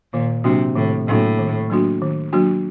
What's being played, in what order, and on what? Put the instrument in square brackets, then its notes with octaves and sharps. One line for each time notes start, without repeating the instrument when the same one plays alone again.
[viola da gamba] A#2 [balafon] D#3
[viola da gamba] C3 [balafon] F#3 A#3 D4 F#4
[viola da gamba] A2 [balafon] D#3
[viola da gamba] A2 [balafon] F#3 A#3 D4 F#4
[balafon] D#3
F#3 A#3 D4 F#4
D#3
F#3 A#3 D4 F#4